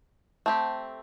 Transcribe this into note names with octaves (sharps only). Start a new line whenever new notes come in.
A3 C4 G4